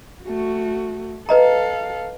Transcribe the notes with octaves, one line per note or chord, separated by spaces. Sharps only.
A3 F#4
A4 B4 D#5 F5 A#5